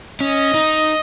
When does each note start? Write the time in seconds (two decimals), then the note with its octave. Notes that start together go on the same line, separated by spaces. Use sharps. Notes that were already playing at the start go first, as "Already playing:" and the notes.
0.20 C#4 D#5
0.54 D#4